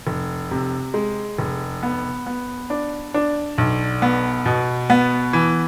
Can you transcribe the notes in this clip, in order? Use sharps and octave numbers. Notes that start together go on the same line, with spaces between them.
F1
C3
G#3
F1
B3
B3
D4
D4
B1
B3
B2
B3
E3